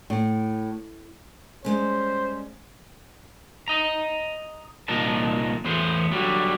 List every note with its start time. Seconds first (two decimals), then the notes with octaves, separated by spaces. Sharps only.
0.10 A2
1.65 G3 G#3 C#4 C5
3.68 D#5 A#5
4.88 C2 A#2 F3 D#4 A#4 A5
5.65 E2 A2 B3 C5
6.11 D3 F#3 G3